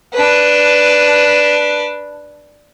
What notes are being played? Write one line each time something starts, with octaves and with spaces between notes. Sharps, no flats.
D4 B4